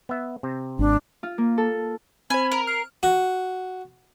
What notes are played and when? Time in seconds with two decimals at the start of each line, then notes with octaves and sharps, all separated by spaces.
0.09 B3 E5
0.43 C3 C4
0.79 G#1 D4
1.23 F4
1.38 A#3
1.58 A4
2.30 C4 C5 G#5 B5
2.52 A#4
2.67 F6 C7
3.03 F#4